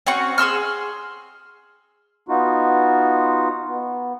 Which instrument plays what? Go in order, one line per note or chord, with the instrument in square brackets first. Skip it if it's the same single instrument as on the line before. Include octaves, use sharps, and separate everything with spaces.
[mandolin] C4 C#4 F#4 C#6
G#4 C6 E6 F6
[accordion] B3 D#4 F4 F#4
B3